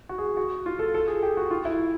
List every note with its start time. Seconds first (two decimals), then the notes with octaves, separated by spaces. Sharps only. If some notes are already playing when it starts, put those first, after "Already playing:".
0.09 F#4
0.18 G#4
0.37 F#4
0.66 F4
0.79 A4
0.94 A4
1.07 G#4
1.23 G4
1.37 F#4
1.51 F4
1.65 E4